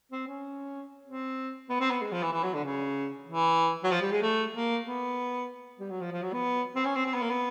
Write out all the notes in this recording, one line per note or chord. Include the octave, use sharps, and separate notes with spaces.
C4
C#4
C4
B3
C4
B3
G#3
F3
E3
E3
F#3
D3
C#3
E3
F#3
F3
G3
G#3
A3
A#3
B3
G3
F#3
F3
F3
F#3
B3
C4
C#4
C4
C4
B3
A#3
B3